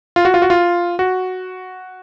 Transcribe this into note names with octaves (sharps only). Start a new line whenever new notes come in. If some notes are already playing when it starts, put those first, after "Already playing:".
F4
F#4
F4
F#4
F4
F#4